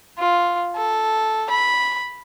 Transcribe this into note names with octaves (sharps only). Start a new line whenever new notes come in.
F4
A4
B5